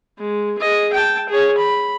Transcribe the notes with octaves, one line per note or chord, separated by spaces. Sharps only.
G#3
G#4 D#5
G5 A5
G#4 C#5
B5